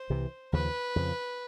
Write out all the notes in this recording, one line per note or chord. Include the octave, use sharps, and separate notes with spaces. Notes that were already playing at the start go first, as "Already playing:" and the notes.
Already playing: C5
C2 C3 E3
D#2 C#3 F3 B4
F2 C#3 F3